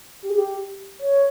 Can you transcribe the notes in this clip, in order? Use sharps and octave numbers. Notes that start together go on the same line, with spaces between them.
G4
G#4
G4
C#5